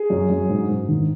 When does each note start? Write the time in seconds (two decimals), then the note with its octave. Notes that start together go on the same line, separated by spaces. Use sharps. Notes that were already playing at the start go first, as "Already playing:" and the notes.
Already playing: G#4
0.10 F#2
0.30 F#2
0.49 G#2
0.69 G#2
0.89 D#3